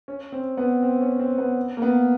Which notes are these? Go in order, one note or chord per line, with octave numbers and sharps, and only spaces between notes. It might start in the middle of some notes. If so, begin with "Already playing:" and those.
C#4
C4
B3
C4
C#4
C4
B3
A#3
B3